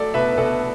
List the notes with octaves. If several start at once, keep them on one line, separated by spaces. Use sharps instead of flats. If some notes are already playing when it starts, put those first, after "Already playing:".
Already playing: F#3 A3 A4 D5
B2 B4 E5
B2 A4 D5